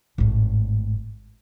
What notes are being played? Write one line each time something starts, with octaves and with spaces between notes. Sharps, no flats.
G#1 A2